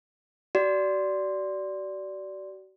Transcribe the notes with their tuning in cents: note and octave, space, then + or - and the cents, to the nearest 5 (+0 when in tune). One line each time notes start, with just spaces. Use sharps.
F#4 +40 D5 -10